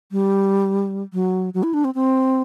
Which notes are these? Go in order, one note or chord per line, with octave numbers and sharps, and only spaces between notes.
G3
F#3
F#3
E4
D4
C4
C4